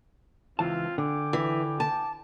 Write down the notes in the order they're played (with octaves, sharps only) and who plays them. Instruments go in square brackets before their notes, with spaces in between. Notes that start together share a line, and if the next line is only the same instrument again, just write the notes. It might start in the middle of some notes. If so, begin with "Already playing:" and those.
[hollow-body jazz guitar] C#2 E3 A5 [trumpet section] C4 F4
[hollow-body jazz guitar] D3 [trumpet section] G5 G#5 D6
[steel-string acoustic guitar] E3
A5